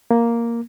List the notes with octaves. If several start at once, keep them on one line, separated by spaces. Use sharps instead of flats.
A#3